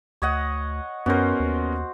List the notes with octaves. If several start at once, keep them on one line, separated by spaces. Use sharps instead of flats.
D2 C#5 D#5 F#5
F#2 B3 C#4 F#4 A#4 C5
D#2